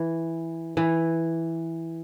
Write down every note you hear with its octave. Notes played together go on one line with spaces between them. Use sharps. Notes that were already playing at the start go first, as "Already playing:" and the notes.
Already playing: E3
E3